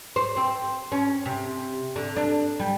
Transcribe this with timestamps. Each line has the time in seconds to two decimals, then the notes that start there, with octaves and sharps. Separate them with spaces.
0.16 C5
0.37 C4
0.92 C#4
1.26 C3
1.96 D3
2.16 D4
2.59 G3